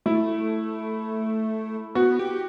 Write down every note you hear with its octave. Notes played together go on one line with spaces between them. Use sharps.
A3 E4
B3 F#4
G4